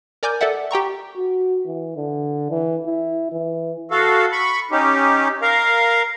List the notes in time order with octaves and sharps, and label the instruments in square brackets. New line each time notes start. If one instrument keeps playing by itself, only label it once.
[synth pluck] A#4 D5 G#5 D6 G6
A4 D5 E5 F#5
G4 G5 A#5 C#6
[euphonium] F#4
E3
D3
E3
E4
E3
[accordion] F#4 A4 F5
B5 C#6
C#4 D#4 G4
A#4 F5 A#5